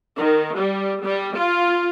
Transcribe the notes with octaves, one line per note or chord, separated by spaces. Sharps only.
D#3
G3
G3
F4